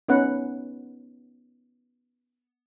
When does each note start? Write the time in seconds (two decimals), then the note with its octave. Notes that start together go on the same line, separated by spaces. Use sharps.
0.09 B3 C#4 D#4 B4 F#5